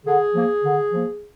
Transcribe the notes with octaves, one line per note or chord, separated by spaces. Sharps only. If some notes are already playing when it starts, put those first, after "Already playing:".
D3 G#4
F3 A#3
D3
F3 A#3